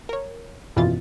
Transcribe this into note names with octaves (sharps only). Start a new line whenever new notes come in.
A#4 C#5
G#1 F#2 B2 E3 F4 A6